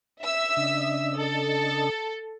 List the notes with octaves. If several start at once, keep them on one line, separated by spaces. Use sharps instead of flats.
E5 E6
C#3 D4 D#5
A4